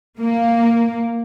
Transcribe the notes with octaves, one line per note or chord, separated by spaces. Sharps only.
A#3